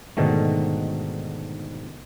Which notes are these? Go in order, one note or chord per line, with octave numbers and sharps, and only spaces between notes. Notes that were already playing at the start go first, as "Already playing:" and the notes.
G#2 B2 D3 D#3 A3